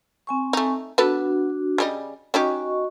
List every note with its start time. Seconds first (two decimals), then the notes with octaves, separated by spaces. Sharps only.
0.27 C4 G#5 C#6
0.53 A3 D#4
0.98 B3 D4 F#4 A4 B4
1.78 C#3 G3 D#5
2.34 C#4 D#4 F#4 G4 D#5 C#6